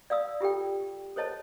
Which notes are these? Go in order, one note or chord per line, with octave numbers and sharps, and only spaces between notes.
D5 F5 D#6 E6
F4 G4 A4 G5
A4 C5 C#5 D#5 A5